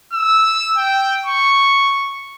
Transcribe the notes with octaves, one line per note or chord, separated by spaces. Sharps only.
E6
G5
C#6